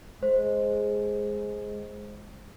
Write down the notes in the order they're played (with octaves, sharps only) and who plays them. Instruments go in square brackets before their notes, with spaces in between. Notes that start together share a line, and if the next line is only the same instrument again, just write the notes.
[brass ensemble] G#3 [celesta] C5